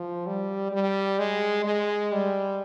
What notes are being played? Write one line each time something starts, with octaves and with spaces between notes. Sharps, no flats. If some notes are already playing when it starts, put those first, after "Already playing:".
Already playing: F3
G3
G3
G#3
G#3
G3